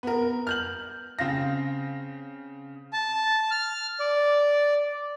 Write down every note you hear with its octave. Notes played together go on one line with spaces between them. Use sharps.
B3 A#4
F6 G6 F#7
C#3 C4 F5 A#6
A5
F6
D5